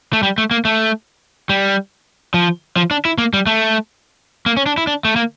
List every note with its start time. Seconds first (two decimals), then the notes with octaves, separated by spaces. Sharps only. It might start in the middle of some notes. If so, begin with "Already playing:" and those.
0.13 A3
0.23 G3
0.38 A3
0.51 A#3
0.65 A3
1.49 G3
2.34 F3
2.77 F3
2.91 D4
3.05 E4
3.18 A#3
3.33 G3
3.47 A3
4.46 A#3
4.57 C#4
4.66 D4
4.77 E4
4.87 D4
5.05 A3
5.16 A#3